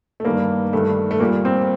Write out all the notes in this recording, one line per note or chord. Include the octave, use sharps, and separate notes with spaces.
A3
G2 D#3 G3 A#3
G2 D#3 G3 A3
A3
A#2 G3 A#3
C4